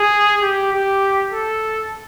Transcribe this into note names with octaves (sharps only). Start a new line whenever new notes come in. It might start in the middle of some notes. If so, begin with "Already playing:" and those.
Already playing: G#4
G4
G4
A4